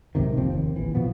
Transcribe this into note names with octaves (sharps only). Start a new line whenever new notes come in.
B1 G#2 C3 D#3
F1 D#2 F3 C4
D#2
A#1 E3
B2 F3 B3